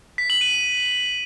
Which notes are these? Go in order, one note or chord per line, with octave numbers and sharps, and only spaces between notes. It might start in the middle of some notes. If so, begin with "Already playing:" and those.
B6
F#7
D#7